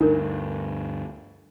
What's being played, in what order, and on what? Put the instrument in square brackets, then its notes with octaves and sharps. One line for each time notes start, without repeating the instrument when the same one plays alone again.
[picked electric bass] D2 G2 [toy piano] D4 A#4 [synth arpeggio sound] D#4